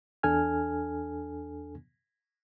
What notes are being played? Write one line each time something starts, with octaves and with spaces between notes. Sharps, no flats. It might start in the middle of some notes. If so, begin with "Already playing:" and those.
E2 D4 A4 G#5 F6